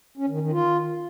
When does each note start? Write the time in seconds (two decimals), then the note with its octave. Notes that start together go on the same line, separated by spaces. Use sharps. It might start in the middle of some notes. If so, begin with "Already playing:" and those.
0.18 C#4
0.29 D#3
0.41 D#3
0.52 F4